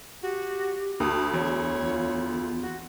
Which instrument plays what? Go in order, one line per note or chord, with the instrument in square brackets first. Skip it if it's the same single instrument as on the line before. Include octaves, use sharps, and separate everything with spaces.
[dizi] F#4 [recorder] G4
[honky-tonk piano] D2 [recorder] F#4 [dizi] D#6
[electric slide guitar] E2 [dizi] C#5
[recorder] F4
[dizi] F#4